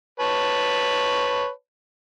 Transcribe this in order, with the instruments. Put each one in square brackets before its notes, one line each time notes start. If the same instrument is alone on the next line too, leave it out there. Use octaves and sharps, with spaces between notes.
[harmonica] B4 C#5 A5